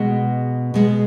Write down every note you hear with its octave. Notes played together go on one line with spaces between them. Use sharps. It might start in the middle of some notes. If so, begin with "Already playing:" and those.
Already playing: B2 G#3 B3
B2 G#3 B3